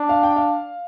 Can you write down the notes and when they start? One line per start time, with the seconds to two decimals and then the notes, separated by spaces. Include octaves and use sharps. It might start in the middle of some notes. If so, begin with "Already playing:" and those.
Already playing: D4
0.09 F5
0.23 G5
0.36 F5